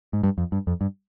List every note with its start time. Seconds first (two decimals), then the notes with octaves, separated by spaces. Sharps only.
0.13 G#2
0.23 G2
0.38 F2
0.52 G2
0.67 F2
0.81 G2